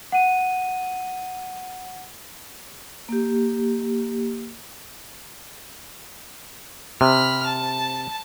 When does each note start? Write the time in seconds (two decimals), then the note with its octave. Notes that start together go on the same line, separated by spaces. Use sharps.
0.12 F#5 D#7
3.09 A#3 G4
7.01 C3 B5 F6
7.46 A5